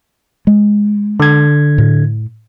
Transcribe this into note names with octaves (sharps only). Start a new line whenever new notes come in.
G#3
D3 G#6
A2